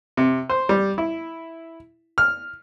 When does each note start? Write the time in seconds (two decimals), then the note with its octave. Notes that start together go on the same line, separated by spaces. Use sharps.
0.17 C3
0.50 C5
0.69 G3
0.98 E4
2.18 F6